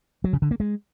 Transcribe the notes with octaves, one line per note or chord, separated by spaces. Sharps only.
F#3
C#3
D3
A#3
G#3